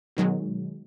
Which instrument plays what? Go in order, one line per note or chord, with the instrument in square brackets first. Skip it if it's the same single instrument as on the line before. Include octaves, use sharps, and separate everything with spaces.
[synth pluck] B2 D#3 F#3 G#3